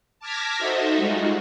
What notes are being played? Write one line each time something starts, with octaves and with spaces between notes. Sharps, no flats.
A5 D6 F6 G#6 A#6 B6
D#4 F#4 A4 C5 D#5 E5
G3 G#3 D#4 F4 F#4